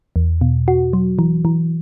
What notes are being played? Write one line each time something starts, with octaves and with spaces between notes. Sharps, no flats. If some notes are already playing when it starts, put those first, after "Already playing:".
E2
B2
F#4
F#3
E3
E3